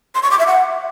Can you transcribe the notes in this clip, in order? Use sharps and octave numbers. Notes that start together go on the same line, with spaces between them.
C6
C#6
D6
E5
F#5